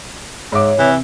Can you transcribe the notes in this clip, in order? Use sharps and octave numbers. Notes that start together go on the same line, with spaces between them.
G#2 C#5 E5 D6
C3 E3